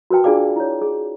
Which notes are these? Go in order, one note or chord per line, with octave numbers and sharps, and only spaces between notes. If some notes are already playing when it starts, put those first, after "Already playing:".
F#4 A#4 B4 G5 A5
D4 F4 G#4 D5 F5 D6
E4 C#5
G#4